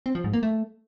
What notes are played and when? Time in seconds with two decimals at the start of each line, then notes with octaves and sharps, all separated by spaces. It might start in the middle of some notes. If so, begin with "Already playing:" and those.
0.06 C4
0.15 F3
0.24 G#2
0.33 A#3
0.43 A3